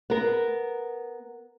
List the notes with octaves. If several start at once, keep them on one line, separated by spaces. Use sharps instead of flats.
B3 A#4